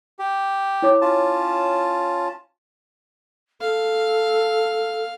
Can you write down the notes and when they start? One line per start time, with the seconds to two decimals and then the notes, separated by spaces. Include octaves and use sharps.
0.19 G4
0.82 E4 C#5 D6
1.01 C#4 F4 A5
3.61 A4 F5